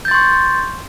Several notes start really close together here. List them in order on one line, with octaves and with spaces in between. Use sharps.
G6 A6 C6 C#6